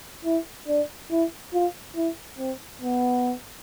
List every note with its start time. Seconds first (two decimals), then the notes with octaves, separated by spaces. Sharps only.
0.25 E4
0.68 D4
1.11 E4
1.53 F4
1.96 E4
2.38 C4
2.82 B3